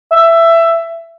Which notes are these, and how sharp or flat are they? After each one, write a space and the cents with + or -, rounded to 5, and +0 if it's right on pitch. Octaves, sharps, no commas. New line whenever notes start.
E5 +15